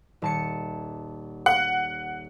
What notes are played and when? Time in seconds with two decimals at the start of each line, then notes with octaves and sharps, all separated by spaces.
0.22 D#1 A5 C#7
1.46 F#5